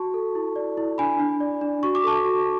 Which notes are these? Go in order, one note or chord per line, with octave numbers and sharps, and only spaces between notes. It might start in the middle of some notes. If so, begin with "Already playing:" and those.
Already playing: F#4 A5 C#6
A4
E4
D5
E4
D4 G#5 B5
D4
D5
D4
F#4 C#6
D6
A4 A5 C#6
F#4